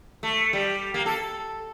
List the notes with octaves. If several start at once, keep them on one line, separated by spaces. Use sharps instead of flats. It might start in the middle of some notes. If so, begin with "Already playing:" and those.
A3
G3
A#3
A4